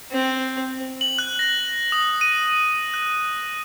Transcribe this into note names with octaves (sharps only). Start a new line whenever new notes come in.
C4
F#7
F#6
A#6
D#6
D#7
F#6